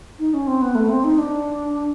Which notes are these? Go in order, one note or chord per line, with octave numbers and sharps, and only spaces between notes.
D#4
C#4
C4
B3
A3
C4
D#4
D4